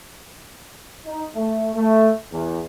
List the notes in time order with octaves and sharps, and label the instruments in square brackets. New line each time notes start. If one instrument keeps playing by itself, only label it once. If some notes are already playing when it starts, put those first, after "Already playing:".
[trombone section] D#4
A3
A3
E2